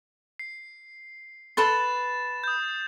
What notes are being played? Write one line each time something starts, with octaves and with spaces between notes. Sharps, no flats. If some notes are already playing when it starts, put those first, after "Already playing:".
C7
A4 B4 C6 A6 E7
D#6 G6